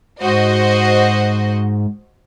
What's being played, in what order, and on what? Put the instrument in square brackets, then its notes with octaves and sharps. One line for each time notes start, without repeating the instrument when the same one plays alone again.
[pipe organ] G#2 [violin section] F#4 C5 D#5